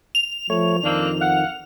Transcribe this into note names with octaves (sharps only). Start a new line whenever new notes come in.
F7
F3 A3 C#5
F2 D#3 A#3 C4 D4
F5 F#5